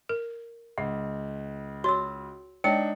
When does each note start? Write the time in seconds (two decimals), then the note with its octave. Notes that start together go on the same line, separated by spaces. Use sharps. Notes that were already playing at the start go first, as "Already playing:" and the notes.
0.09 A#4
0.78 C#2 F#5
1.84 F#4 C#5 C6 E6
2.64 G#3 D4 D#4 C#5 G5